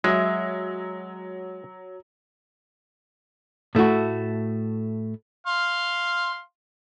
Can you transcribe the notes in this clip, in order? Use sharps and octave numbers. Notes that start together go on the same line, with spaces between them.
F#3 G#3 E5
A2 A3 E4 F#4
F5 C6